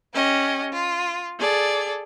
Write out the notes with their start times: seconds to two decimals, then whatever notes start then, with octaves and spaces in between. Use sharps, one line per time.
0.14 C#4 G4 D#5
0.72 F4
1.39 G#4 A4 D5